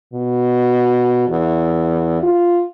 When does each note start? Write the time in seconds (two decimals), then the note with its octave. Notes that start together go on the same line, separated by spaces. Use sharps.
0.13 B2
1.29 E2
2.23 F4